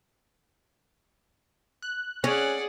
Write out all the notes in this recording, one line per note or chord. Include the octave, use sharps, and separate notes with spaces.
F#6
C#4 G#4 D5 F#5